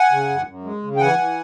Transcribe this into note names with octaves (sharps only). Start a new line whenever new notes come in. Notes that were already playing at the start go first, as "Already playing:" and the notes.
Already playing: F#5 G#5
C#3
F#2
F#2
G#3
C#3
G5
E3 F#5 G#5
E3